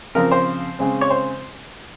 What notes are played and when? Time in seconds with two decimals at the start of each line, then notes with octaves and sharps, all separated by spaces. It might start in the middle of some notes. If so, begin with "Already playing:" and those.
0.15 C#3 F3 C4 A#4
0.31 C5
0.79 C#3 G#3 C4
1.01 C#5
1.10 C5